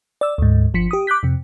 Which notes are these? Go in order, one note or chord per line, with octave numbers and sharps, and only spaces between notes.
D5 E6
D2 G#2
G1 F3 B6 C#7
G4 D#6
D6 F#6 G6 B6
F2 C3